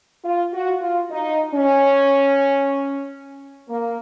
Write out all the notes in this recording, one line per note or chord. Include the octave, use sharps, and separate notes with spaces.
F4
F#4
F4
D#4
C#4
A#3